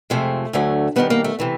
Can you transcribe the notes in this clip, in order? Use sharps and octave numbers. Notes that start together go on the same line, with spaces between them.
F2 C3 F3 G#3 A3
D2 D3 F#3 A3
F#2 D#3 G3 B3
A#3
A3
C3 E3 A3